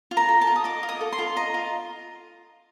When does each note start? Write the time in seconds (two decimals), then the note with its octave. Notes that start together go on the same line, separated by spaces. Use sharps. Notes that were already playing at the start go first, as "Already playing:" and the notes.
0.11 F4
0.17 A#5
0.29 A4
0.41 A5
0.47 F4
0.56 D#6
0.64 D#5 D6
0.83 F4
0.89 D#6
1.01 A4
1.13 C6
1.19 F4
1.36 D#5 A#5
1.54 F4